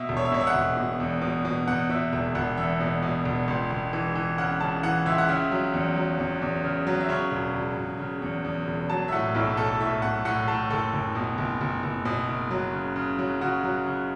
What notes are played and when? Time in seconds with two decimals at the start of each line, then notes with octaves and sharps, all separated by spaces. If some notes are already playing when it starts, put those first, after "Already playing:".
Already playing: B2 E5
0.09 E1
0.17 C#5
0.25 E5
0.32 B2 C#5
0.41 E5
0.47 F#5
0.55 E1
0.77 B2
1.00 E2
1.22 B2
1.45 B2
1.68 E2 F#5
1.90 B2 E5
2.12 E1 E5
2.35 E1 F#5
2.57 E2 E5
2.80 B2
3.03 B2
3.25 E1
3.48 C#2
3.71 C#2
3.93 E3
4.15 E3
4.38 C#3 F#5
4.60 C#3 A5
4.83 E3 F#5
5.06 C#2 E5
5.18 F#5
5.28 C#3 E5
5.51 F#3
5.74 E2
5.96 F#3
6.19 E2
6.41 E2
6.64 C#3
6.87 F#3
7.01 E5
7.09 C#3 C#5
7.31 E1
7.54 E1
7.77 E1
7.99 C#3
8.22 E2
8.44 E2
8.67 E1
8.90 F#3 A5
9.08 E5
9.12 A2 F#5
9.35 B1 E4
9.57 B1 A4
9.80 A2 E5
10.02 B1 F#5
10.25 A2 F#5
10.48 A2 A5
10.70 F#1 A4
10.93 F#1
11.15 B2
11.38 F#1
11.61 F#1
11.83 F#1
12.05 B2
12.29 F#1
12.51 F#3
12.73 C#3
12.96 C#3
13.19 F#3
13.41 C#3 F#4
13.64 F#3
13.86 C#3